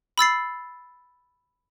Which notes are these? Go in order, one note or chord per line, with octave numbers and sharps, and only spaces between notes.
B5 E6 A6 C7